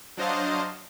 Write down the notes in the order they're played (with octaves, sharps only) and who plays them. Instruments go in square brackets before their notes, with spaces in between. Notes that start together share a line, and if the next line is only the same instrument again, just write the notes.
[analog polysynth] F#3 D4 C5 D#5 F5